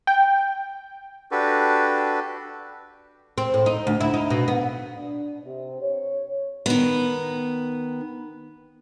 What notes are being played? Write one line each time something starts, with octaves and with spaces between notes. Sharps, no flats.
G5
D4 F#4 G4 A4 B4
C4
A2
D#4
D2
E4
D#4
B2
B3
D4
C3
C#5
D#3 B3